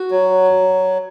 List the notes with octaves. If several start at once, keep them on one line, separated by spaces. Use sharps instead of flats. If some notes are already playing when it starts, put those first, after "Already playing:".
Already playing: F#4
F#3